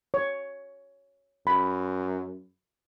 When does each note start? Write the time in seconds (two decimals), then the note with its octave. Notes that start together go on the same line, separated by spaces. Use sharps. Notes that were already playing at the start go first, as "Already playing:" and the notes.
0.14 C#5
1.47 F#2 B5